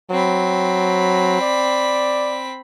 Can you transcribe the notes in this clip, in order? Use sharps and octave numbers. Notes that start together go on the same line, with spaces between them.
F#3 C4 B5
D5